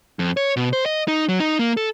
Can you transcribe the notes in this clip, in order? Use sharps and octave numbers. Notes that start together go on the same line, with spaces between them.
F2
C#5
B2
C5
D#5
D#4
F#3
D#4
A#3
A4